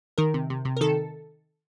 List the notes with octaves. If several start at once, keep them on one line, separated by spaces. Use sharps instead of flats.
D#3 A#4
C3
C3
C3
A#4
D#3 A4